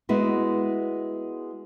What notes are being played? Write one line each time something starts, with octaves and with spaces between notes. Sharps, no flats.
G#3 B3 E4 F#4